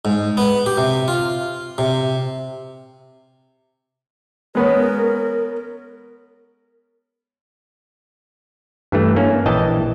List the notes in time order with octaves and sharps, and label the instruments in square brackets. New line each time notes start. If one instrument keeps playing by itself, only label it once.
[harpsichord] G#2
B3
G4
C3
F4
C3
[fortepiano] G#3 B3 C#4 [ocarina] A#4
[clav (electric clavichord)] G2 E3 A3
A#3 C#4
A#1 E3 D#5 G5 A5